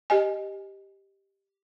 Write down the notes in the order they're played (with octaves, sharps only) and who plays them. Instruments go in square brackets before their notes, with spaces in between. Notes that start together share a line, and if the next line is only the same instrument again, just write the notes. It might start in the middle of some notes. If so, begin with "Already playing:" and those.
[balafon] G4 D#5 G#5